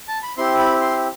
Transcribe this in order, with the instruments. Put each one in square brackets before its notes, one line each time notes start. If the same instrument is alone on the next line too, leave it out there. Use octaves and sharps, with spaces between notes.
[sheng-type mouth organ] A5
B5
C4 E4 G4 C6
B5
C6